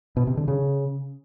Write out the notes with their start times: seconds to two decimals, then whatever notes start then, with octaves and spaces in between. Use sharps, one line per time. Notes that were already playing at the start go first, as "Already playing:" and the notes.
0.17 B2
0.27 C3
0.37 D3
0.48 C#3